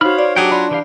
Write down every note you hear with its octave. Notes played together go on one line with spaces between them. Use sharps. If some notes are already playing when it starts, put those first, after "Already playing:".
D#4 F#4 C5 C#5 F5 B5 F6
D5
F#3 D4 G4 G#4 G5
F4 D5 B5
E3 G4 F5